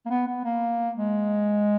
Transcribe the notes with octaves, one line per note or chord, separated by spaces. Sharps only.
A#3
B3
B3
A#3
G#3